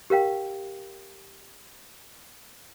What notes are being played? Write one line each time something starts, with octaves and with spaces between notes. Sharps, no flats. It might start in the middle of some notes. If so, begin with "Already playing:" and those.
G4 A#4 F5 G5